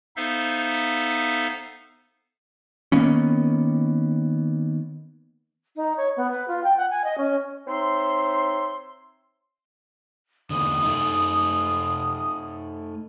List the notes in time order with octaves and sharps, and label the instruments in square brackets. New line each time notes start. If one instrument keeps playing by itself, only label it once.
[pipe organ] B3 D#4 A4 C5 E5 F5
[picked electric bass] D#3 A#3 B3 C#4
[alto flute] D#4
C#5
B3
B4
F4
G5
F#5
G#5
D#5
C#4
[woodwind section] C4 D#4 C#5 E5 C6
[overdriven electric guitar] E2 D3 [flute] D#6
[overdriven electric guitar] A3 D#4